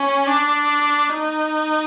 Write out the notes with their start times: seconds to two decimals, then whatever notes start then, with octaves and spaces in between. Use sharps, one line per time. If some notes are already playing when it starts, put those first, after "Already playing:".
Already playing: C#4
0.27 D4
1.09 D#4